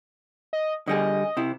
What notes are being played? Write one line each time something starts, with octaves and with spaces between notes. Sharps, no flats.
D#5
D3 G3 G#4 D#5
C3 E4